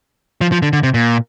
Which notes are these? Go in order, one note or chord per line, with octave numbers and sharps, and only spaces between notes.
F3
F3
D3
D3
C3
A#2